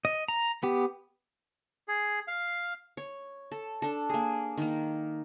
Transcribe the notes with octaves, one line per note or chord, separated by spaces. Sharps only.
D#5
A#5
B3 G4
G#4
F5
C#5
A4
D4 A4
A#3 G#4
D#3 A#3